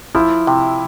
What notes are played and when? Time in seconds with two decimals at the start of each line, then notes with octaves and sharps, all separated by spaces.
0.15 F3 E4
0.47 C3